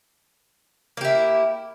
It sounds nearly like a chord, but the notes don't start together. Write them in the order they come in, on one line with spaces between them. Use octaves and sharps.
A#3 G4 E4